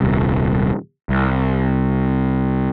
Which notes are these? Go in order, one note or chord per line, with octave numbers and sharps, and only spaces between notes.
D#1 C2
C2